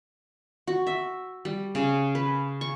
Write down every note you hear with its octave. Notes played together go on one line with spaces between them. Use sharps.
F#4
E5
G3
C#3
B4
C#6